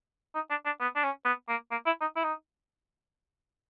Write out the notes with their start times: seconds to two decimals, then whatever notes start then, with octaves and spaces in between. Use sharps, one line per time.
0.35 D#4
0.50 D4
0.66 D4
0.80 B3
0.96 D4
1.03 C#4
1.25 B3
1.49 A#3
1.71 A#3
1.86 E4
2.01 D#4
2.16 E4
2.24 D#4